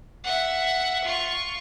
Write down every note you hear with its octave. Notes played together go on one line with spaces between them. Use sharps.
E5 F#5
F4 C#6